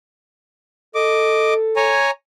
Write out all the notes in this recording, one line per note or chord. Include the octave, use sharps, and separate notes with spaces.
A4 D#5 D6
C#5 G#5 A#5